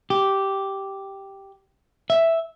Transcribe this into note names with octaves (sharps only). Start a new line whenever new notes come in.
G4
E5